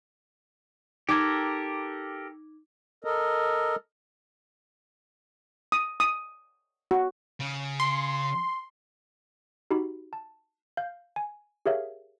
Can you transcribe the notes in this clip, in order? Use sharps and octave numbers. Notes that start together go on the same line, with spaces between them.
D#4 G4 A4 A#4 D6 G#6
A4 A#4 D#5
D#6
D#6
F#4
C#3
C6
D#4 F#4 G4 B5
A5
F5 G6
G#5
G4 G#4 A#4 C#5 E5 F5